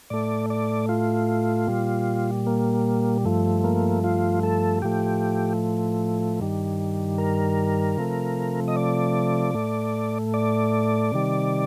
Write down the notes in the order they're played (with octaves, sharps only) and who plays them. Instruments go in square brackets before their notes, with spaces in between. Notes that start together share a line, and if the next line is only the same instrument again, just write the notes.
[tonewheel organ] A2 A3 D5
D5
F4
A#2 G3
A#3
G2 F3 A3
A#3
F4
A4
A2 F3 A3 G4
G2 D#3 G3
A#4
C3 F3 A3
D#5
D5
A2 A3
D5
C3 D#3 G3